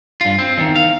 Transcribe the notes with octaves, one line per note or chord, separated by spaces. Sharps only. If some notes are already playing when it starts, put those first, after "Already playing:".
G2 F4
C4
E2 D#3
F5